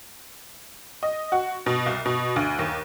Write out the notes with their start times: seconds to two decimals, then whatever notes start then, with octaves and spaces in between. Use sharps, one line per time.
1.03 D#5
1.32 F#4
1.66 B2
1.86 C2
2.06 B2
2.36 D2
2.59 D#2